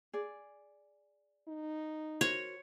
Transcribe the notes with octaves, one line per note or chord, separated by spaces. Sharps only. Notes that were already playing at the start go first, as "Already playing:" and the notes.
G#4 D5
D#4
F#4 A#4 C5 C#5